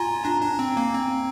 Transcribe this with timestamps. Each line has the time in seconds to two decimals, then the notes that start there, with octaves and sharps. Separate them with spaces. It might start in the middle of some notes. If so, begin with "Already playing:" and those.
Already playing: F4 G#5 A#5
0.24 D4 A#5
0.41 D4
0.59 C4
0.77 A#3
0.94 C4